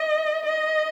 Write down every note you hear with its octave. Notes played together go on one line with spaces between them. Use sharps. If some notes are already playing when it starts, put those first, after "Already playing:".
Already playing: D#5
D#5